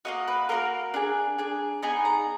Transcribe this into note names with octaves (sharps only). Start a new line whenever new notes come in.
A#3 D#4 F#4 D#5
B4
A#3 D#4 F#4 A#4
D4 G#4
D4 G#4
B3 D#4 G#4 G#5
A#5